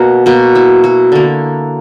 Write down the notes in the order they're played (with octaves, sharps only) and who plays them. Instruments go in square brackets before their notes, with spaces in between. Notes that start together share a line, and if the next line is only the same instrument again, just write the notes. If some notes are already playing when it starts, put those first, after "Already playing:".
Already playing: [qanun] B2 A#3 F#4 A#4
B2 A#3 F#4
E4
F#4
D3 A#3